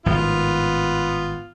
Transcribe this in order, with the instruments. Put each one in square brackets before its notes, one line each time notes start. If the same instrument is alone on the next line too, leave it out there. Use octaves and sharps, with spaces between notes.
[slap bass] G#1 A2 F3 [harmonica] B3 F4